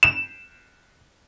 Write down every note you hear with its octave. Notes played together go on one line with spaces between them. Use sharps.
E7